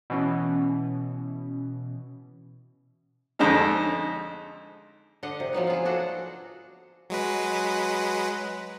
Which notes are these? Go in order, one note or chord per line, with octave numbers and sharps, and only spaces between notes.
B2 E3 C#4
F2 G#2 D3 G#3 C#4 D#4
D3 D#5 F#5
C3
F3 F#3 B3 D#4
F4 G#4
D4 F#4 A4 F#5
F#3 G#3 B4